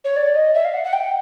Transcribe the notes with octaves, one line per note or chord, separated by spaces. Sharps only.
C#5
D5
D#5
E5
F5
F#5
F#5
G5